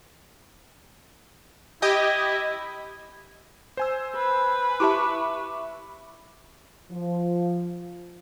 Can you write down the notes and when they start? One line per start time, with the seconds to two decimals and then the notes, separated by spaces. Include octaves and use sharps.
1.82 E4 G4 D#5 G5
3.77 C5 G#5 E6
4.16 B4
4.80 E4 G4 E5 A5 C#6 D6
6.92 F3